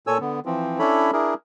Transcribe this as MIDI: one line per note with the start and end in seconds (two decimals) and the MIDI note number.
0.07 0.18 46
0.07 0.18 69
0.07 0.18 73
0.07 0.18 80
0.07 0.18 88
0.21 0.40 50
0.21 0.40 59
0.46 0.79 52
0.46 0.79 53
0.46 0.79 60
0.79 1.11 61
0.79 1.11 62
0.79 1.11 64
0.79 1.11 69
0.79 1.11 73
0.79 1.11 83
1.13 1.34 62
1.13 1.34 64
1.13 1.34 68
1.13 1.34 70